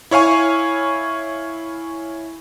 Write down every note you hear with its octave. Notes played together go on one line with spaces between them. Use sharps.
E4 C#5 F5 G#5 C#6